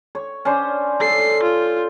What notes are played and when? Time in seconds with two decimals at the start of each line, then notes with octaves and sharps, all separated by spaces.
0.15 C#5
0.45 C#4 D4 C5
1.01 A4 C7
1.43 F4